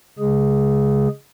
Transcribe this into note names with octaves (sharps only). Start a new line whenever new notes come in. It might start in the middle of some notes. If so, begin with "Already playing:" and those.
C#3 G#3 G#4